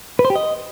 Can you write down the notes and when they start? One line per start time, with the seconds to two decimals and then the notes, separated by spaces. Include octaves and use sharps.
0.19 B4
0.25 C5
0.30 G4
0.35 D#5